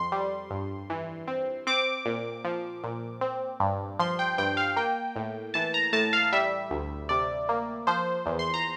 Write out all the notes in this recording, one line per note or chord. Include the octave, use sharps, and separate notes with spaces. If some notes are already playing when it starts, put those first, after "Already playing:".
Already playing: F2 C6
G3
G2
E3
C4
C4 D6
A#2
F3
A#2
C4
G2
F3 C6
G5
G2 G5
F5
A#3 G5
A2
E3 A5
A#5
A2 A5
F5
G3 E5
D2
C3 D5
A#3
F3 C5
E2
C6
A#5